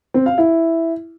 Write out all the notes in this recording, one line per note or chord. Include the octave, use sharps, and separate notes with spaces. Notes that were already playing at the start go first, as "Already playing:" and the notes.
C4
F5
E4